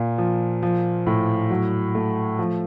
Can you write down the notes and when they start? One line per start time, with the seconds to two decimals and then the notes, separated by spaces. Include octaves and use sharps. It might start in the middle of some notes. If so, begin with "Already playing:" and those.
Already playing: A#2
0.18 F3
0.63 F3
1.07 A2
1.50 F#3
1.95 A3
2.39 F3